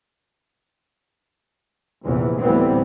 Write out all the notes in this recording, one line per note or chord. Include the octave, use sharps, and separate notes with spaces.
A#1 E2 C3 E3
D2 A2 E3 G3 B3 C4